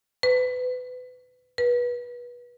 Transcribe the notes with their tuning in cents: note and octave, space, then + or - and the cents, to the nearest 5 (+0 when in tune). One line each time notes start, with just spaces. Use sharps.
B4 +30
B4 -25